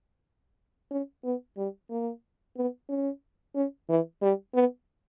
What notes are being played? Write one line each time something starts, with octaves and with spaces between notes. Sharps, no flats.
C#4
B3
G3
A#3
B3
C#4
C#4
E3
G3
B3